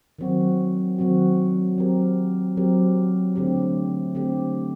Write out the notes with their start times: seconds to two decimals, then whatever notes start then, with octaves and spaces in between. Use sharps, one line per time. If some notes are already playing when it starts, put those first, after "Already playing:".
0.19 D#3 F#3 C4 F#4
0.98 D#3 F#3 C4 F#4
1.78 F#3 C4 G4 A#4
2.57 F#3 C4 G4 A#4
3.36 D3 A3 C4 G4
4.15 D3 A3 C4 G4